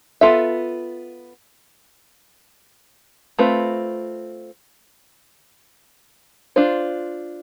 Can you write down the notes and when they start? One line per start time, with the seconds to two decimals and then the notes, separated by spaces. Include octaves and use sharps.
0.21 B3 F4 A4 E5
3.38 A3 C4 F4 B4
6.56 D4 F4 C5